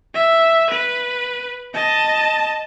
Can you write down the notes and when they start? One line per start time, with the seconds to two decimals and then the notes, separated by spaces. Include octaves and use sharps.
0.15 E5
0.70 B4
1.74 D#5 A5